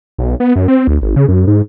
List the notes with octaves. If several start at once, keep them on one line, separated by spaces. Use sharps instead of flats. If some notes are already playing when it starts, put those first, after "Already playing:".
B1
B3
F#2
C4
D2
G#1
C#3
F#2
G#2